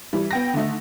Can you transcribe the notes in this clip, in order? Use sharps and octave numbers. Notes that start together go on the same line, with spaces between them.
E3 G3
B3 G5 A#6
D3 D#3 A3 D#4